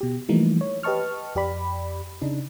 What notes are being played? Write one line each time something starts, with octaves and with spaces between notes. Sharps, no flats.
B2 G4
E3 F3 G3 A3 A#3 D#4
C#5
G4 B4 D#5 A5 C#6 F6
F2 G4 D5 B5
C#3 D4 D#4